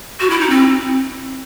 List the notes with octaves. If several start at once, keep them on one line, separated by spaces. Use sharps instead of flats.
F#4
E4
D#4
C4